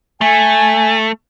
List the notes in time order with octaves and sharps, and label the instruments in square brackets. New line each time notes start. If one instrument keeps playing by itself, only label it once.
[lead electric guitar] A3 [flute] G#5